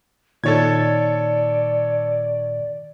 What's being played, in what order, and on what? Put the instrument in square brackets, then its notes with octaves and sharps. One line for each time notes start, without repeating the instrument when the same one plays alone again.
[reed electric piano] A#2 D#3 A6 [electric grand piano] A4 C#5 G#6 [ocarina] D5